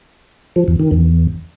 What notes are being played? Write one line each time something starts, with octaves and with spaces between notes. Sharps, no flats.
F3
E2
D#3
E2